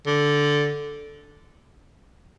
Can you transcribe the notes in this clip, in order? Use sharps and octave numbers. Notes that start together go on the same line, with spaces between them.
D3